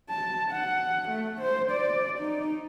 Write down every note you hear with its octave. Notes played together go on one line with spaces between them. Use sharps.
A5
F#5
A3
C5
D5
D#4